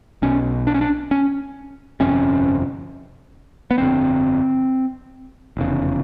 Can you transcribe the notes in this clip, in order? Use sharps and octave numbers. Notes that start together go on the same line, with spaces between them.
B1 B2 C#4
D4
C#4
D4
C#4
G1 F2 C3 C#4
B3
G1 F2 D3 C4
F1 E2 C#3